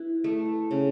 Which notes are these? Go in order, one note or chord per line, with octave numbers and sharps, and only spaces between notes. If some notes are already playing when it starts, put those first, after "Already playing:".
Already playing: E4 B4
A3
C#3